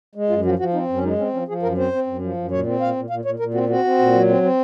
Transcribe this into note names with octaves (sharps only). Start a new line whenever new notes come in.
G#3
F#2 F4
F3 F#4
F3 F#4
C4 D#4
F#2
C#4
G#3 D#4
C4 C#4
F3 C#4
F3 G#4
F#2 A#4
C4 C5
C4
F#2
F3
F#2
A#2 C#5
C4
A#2 F5
A#2
A#2 F5
A#2 C#5
A#2 A#4
C4 F#4
C4 F#4
C4
A#2
F#3
C4
C4